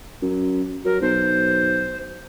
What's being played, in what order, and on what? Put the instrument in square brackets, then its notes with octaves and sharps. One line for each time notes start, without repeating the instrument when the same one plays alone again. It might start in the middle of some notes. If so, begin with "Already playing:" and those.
[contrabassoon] F#2
[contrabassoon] F#3 [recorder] A#4
[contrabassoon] B1 [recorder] C5